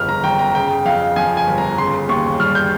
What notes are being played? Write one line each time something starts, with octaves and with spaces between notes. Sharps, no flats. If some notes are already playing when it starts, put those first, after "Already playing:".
Already playing: G1 F2 C#3 F6
A#5
G1 G5
A#5
C#3 G5
F2 F5
F3 G#5
G#5
G1
A#5
C#3 C6
D#2 C#6
G3 F6
G6